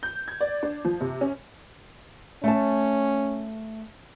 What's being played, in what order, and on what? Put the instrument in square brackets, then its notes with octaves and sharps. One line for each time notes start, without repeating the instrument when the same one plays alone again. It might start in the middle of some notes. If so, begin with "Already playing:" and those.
[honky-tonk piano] G6
G#6
D5
D4
F3
C3
C#4
[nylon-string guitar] A3 A5 [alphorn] C#4